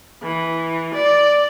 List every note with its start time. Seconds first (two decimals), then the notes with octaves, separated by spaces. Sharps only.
0.22 E3
0.93 D5